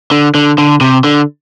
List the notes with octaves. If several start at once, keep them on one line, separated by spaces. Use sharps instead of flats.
D3
D3
D3
C3
D3